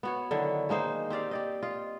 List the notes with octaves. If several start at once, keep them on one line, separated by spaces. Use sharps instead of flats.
B3 F#4 C#5
D3 D#3 F#3 E4
G#3 A#3 D#4 C5
C4 G4 D5 F5
G4 D5 D#5
F4 D#5